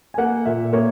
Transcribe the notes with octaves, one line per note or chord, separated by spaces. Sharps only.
G#5
A#3 F#5
A#2 E5
A#3 C#5